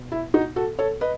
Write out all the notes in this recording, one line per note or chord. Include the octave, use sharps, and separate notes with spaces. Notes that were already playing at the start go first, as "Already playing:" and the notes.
Already playing: B2
E4
D#4 F#4
F#4 A4
A4 C#5
B4 D#5